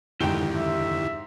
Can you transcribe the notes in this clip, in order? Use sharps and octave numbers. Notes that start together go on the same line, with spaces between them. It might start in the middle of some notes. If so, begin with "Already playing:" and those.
F2 G#2 D3 D#3 E4 G4 G5 G7
E5